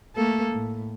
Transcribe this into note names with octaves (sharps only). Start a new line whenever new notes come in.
A3 A#3 A4
A2